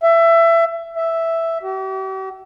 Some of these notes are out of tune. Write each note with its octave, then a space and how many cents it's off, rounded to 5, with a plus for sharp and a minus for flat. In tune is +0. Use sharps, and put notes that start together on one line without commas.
E5 +20
E5 +0
G4 -45